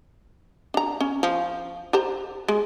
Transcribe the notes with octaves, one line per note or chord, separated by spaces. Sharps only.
D4 A#5
C#4
F3
G4 C5 A#5
G#3